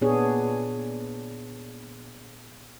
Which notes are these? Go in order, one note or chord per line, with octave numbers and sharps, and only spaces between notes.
A#2 B3 D4 G#4 C#5